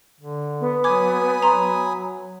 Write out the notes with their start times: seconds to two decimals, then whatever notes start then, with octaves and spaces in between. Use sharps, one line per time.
0.20 D3
0.60 B3
0.84 F#3 G#5 B5 D6 D#6 G#6
1.43 F#3 A#5 C6